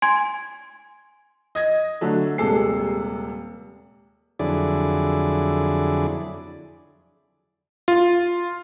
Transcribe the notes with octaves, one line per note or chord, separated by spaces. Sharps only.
G#5 C6 G#6
D#5 G#6 A#6
D3 F#3 A3
D#1 C3 G#3 A4 C7
F2 D3 F#3 E4 G#4 D5
F4